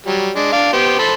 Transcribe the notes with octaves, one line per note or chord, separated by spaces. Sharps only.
F#3 G3
G#3 D4
D4 F5
B3 G4 C5
A4 C5 B5